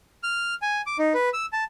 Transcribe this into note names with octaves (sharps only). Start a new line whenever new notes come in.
F6
G#5
D6
D#4
B4
E6
A5